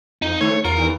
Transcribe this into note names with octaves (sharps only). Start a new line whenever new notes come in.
F2 D#4
D3 A3 C#5
E2 F4 A#4
G2 D#3